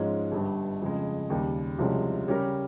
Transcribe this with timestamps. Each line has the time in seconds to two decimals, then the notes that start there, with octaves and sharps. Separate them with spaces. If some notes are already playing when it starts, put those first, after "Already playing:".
Already playing: G#2 F3 G#3 C#4
0.32 G1 G2 G3
0.81 F2 C#3 G#3
1.30 D#2 C#3 G3
1.79 C2 C3 F3 G#3 C#4
2.27 C#3 G3 C#4 G4 A#4